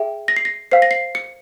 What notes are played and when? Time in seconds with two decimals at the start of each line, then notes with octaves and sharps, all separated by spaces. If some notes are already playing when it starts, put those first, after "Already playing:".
Already playing: G#4 E5 G5
0.28 A#6
0.36 C7
0.45 A#6
0.72 C5 F5 C7
0.82 A#6
0.91 C7
1.15 C#7